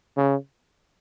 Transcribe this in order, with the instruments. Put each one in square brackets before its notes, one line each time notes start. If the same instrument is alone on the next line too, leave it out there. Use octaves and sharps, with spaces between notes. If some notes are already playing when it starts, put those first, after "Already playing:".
[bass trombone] C#3